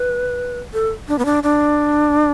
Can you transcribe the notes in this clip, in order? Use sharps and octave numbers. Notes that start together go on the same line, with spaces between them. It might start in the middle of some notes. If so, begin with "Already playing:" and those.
Already playing: B4
A4
D4
B3
D4
D4